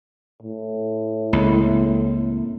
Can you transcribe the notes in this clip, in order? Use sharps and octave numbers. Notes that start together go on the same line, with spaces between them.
A2
C#2 A#3 C4 E4